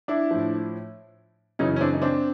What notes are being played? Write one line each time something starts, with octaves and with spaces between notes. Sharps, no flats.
D4 E4
A2 F3
F#2 C#3 E3 C#4 D#4
C#4
C4 D4
D#4
C4 D4